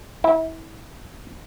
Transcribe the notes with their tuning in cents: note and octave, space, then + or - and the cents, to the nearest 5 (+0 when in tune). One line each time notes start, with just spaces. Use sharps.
E4 -25